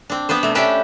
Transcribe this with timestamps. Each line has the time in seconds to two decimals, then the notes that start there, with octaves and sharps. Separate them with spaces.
0.10 C4 D4
0.29 B3 D4 B4 C5
0.43 C3 A3
0.55 C#4 D4 G4 B4 E5 G5